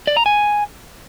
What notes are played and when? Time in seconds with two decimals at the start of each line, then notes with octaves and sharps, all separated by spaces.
0.07 D5
0.17 A#5
0.26 G#5